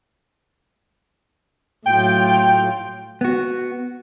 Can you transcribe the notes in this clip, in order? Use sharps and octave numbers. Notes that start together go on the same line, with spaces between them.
A2 F#3 F4 G5
B3 F#4